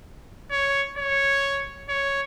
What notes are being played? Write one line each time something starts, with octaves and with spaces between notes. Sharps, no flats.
C#5
C#5
C#5